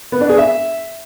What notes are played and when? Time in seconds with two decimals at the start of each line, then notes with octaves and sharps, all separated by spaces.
0.12 B3
0.21 D4
0.29 G#4
0.38 E5